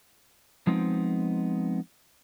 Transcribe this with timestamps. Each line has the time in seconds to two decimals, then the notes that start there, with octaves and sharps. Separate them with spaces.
0.67 F3 G#3 B3 C4 D#4